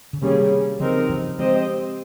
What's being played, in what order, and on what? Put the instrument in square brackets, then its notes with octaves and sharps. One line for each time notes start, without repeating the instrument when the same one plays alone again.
[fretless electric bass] C#3
[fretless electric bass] C3 D#3 [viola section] G3 A#3 C#4 G#4
[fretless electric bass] C#3 F3 [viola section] C4 D#4 A#4
[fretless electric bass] C#3 F3
[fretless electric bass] F3 G#3 [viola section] C4 G4 C5 D#5